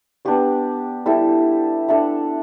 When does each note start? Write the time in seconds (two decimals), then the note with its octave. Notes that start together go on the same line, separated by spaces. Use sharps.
0.25 B3 D4 G4 D5
1.06 G3 E4 A4 E5
1.88 D4 A4 E5